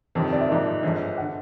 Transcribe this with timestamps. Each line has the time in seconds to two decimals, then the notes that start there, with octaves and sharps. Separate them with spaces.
0.15 G1 F2 C3 D#3 C5
0.33 D5
0.41 E5
0.49 G#1 G#2 F3 A#3 D#5
0.83 G1 G2 D3 F3 G#3
1.18 D3 F#5